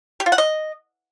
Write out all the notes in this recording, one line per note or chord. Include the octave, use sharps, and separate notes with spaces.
G4
F4
F#5
D#5